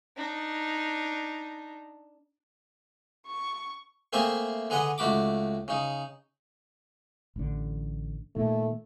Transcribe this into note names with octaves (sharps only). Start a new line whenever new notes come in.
D4 D#4
C#6
A3 A#3 C4 G#4 E5
D3 G#4 B4 D#5 F#5
C#2 A3 F#4 B5 D6
C#3 D#4
A1 D3
A#2 D#3 A3